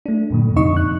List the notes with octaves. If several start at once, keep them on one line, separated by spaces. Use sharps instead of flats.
A3 D4
F#2 A#2 D3
F2 C3 D#4 D#5 C#6
F2 F#6